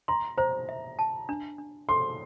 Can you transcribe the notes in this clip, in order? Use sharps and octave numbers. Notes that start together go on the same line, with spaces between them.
A#5 C6
C5 A#5
E5
A5
D4
D4
A4 C6